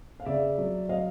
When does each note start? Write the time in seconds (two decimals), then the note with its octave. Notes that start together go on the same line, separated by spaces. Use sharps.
0.20 F5
0.25 C#3 D5 E5
0.58 F#3
0.89 F#3 D#5 F5